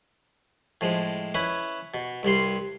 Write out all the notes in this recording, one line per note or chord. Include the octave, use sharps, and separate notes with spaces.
A2 F3 G#3
C#4 E4 B4
B2
C2 G2 G3 C6